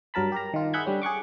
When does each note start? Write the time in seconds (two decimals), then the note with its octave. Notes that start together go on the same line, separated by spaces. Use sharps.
0.14 G2 F#3 A#4 A5 B5
0.32 G4 A#4 A#5
0.54 D#3 F4
0.73 G#4 E5 F#5 B5 G6 G#6
0.86 D3 G3 C#4
1.02 G#4 F#5 C#6 D6